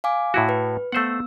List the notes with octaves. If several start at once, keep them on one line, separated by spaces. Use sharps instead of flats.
F5 G#5 D6
A2 E4 F#4
B4
A3 B3 C5 F#5 E6